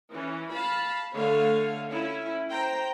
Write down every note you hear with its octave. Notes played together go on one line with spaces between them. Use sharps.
E3 C#4
F5 A5 B5
D3 A3 C#5 F5
C#4 E4
C5 G5 A#5